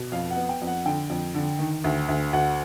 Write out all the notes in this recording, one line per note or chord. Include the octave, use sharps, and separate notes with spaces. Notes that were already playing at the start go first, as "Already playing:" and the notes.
Already playing: B2
F2 F5
F#5
B3
G5
F2
F#5
D3 G5
F2
D3
D#3
D2
D2
D2 F#5